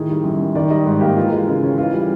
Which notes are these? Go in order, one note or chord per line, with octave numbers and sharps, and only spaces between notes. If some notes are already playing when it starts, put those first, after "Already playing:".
Already playing: A2 D#3 G#4
G3
F#2
F#2
D#3 D5
G3 D#5
G#2
A#3 G4
E3 F4
G#3
C#3
C#4
E3 F4
G3